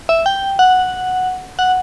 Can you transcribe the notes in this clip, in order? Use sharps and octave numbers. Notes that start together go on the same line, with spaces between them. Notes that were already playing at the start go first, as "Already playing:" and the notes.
E5
G5
F#5
F#5